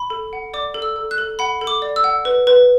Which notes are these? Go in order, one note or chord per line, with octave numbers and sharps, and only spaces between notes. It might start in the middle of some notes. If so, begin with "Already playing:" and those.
Already playing: B5
A4
F#5
D5 D6
A4
E6
A4
F#6
A4
F#5 B5
A4
D6
D5
E6
F#5
B4
B4